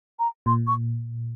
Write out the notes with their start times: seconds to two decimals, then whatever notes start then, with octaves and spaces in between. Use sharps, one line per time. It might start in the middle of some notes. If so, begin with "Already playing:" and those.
0.19 A#5
0.46 A#2 C6
0.67 C#6